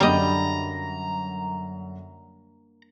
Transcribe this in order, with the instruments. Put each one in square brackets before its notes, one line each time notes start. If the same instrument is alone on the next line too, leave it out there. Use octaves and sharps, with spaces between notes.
[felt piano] F#2 D3 [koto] G3 D#5 [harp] A#3 D4 B5 [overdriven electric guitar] A#5